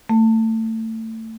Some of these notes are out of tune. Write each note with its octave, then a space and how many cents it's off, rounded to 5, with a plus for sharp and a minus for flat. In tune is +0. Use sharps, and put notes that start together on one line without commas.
A3 +25